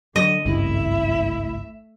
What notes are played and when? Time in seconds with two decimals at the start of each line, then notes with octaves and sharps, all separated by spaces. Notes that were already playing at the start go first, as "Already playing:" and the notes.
0.16 D3 F#3 D#5
0.45 G#1 C#2 G2 A3 E4 E5